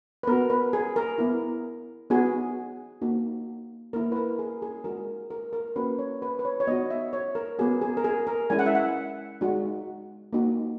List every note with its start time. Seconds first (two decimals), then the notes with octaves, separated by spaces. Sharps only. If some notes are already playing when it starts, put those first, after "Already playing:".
0.23 B4
0.27 B3 A#4
0.32 F#4
0.50 B4
0.73 G#4
0.96 A#4
1.18 B3 E4
2.10 B3 D#4 F#4 G#4
3.02 A#3 D#4 F#4
3.93 A#3 E4 A#4
4.12 B4
4.16 A#4
4.39 G#4
4.62 G#4
4.84 G#3 D#4 F#4 A#4
5.30 A#4
5.53 A#4
5.76 A#3 C#4 F#4 B4
5.99 C#5
6.22 B4
6.39 B4
6.45 C#5
6.60 C#5
6.67 B3 D#4 F#4 D#5
6.90 E5
7.13 C#5
7.35 A#4
7.59 B3 F#4 G#4
7.81 G#4
7.97 A#4
8.04 G#4
8.27 A#4
8.50 G#3 C#4 E4 G#5
8.59 F#5
8.66 E5
8.75 F#5
9.41 G#3 D#4 F#4
10.33 A#3 D#4 F#4